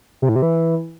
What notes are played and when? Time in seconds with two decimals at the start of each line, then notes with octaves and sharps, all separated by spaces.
0.22 C3
0.29 A2
0.36 C3
0.42 E3